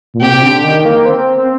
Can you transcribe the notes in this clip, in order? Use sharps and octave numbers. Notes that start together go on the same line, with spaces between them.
A#2
C3 G4
C3
D3
D#3
A#3
C4
C4